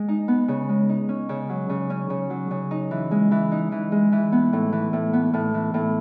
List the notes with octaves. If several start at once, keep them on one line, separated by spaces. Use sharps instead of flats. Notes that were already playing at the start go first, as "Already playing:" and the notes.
Already playing: G#3
D#4
B3
C#3
G#3
D#4
C#4
C#3
F#3
C#3
C#4
C#3
F#3
C#3
D#4
E3
G#3
E3
D#4
E3
G#3
E3
B3
A2
E3
A2
B3
A2
E3
A2